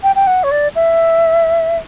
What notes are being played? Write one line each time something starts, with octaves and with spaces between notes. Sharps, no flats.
G5
G5
F#5
C#5
D5
E5